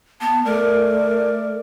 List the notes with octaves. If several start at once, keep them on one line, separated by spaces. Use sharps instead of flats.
B3 A5
A3 A#4 D5